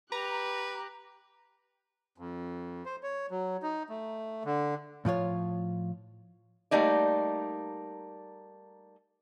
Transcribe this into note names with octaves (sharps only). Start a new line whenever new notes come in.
G4 B4 A#5 F#6
F2
C5
C#5
F#3
D#4
A3
D3
A2 F3 F4 C#5
G3 A3 A#3 D#4 D5